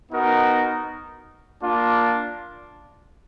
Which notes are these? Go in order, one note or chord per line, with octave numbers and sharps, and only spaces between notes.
B3 D#4 F#4 A#4
A#3 D4 F4